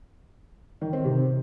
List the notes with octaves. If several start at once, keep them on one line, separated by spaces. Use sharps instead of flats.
D#3
C4
C3